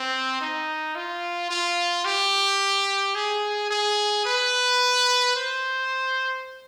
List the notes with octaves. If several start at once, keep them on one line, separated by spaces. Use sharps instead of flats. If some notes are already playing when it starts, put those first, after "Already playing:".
Already playing: C4
D#4
F4
F4
G4
G#4
G#4
B4
C5